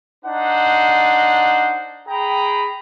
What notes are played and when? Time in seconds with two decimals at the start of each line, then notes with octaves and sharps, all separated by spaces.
0.25 D4 D#4 C5 F#5
2.08 G#4 G5 A#5 B5